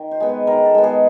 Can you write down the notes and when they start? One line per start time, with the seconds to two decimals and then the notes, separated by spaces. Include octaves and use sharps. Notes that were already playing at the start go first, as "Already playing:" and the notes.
Already playing: D#3
0.11 C5
0.20 G#3 B3
0.29 B4
0.47 D#3 A#4
0.65 A4
0.75 G#3 B3
0.84 G#4